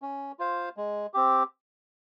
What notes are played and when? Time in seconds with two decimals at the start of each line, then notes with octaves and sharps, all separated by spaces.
0.02 C#4
0.39 F4 C5 F5
0.77 G#3
1.14 C4 G4